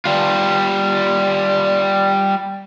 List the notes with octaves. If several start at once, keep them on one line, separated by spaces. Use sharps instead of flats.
G3 F4